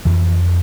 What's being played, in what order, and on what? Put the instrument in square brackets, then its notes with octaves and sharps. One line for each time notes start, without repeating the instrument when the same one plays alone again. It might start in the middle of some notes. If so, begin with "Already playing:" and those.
[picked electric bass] F2 E3